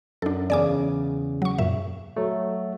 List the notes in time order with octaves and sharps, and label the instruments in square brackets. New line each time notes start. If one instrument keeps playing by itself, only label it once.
[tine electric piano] F#2 [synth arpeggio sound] D4 A4
[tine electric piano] E2 C#3 [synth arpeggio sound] D5 G#5 D6
[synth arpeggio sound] F#3 C#6
F#2 A#2 E5
[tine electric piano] F#3 A3